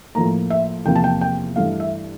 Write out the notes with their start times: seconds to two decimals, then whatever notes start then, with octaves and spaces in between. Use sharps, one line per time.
0.15 A2 F3 A#3 A#5
0.50 E5
0.85 E2 C3 F3 A#3 G5
0.95 A5
1.04 G5
1.21 G5
1.55 G2 E3 A3 F5
1.80 E5